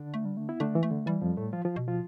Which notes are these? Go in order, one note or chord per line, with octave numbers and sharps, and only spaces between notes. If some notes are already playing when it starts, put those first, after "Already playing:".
Already playing: D3 D4
A3
G3
A3
B3 E4
D3 A3 D4
E3
A3
D3
E3 G3
F2 F3
A2 A3
F3 F4
F3 F4
B2
F3 F4